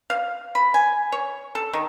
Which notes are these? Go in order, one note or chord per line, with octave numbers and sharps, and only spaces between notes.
F5
B5
G#5
C#5
A4
D#3